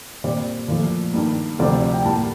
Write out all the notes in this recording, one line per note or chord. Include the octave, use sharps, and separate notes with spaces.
A#2 G3 C4 D5
A#2 F3 A3
G2 D#3 A#3
D2 C3 F3 A3 C4 D5
C5
D5
G5
A2 G3 A#3 A5